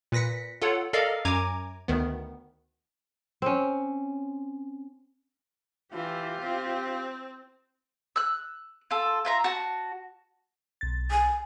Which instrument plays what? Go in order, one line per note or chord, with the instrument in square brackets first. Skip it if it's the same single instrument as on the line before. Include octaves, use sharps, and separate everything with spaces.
[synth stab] A#2 B4 A#6 B6 C#7
F4 A4 C#5 F#5
A4 A#4 D5 D#5 F5
F#2 G#5 A#5 D6 G#6
D2 D#3 B3
[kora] C4 C#4
[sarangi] E3 [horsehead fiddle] F4 G4
[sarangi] C4
[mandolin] E6 F#6
F4 A4
F4 E5 A#5
F#4 A5
[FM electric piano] B1 A6
[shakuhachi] G#5